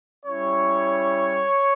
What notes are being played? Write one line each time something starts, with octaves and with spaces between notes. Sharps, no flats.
G3 C#4 E4 C#5